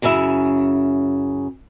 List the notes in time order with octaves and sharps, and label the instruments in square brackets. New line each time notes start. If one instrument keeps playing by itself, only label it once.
[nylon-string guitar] F#2 C#3 C#4 E4 E5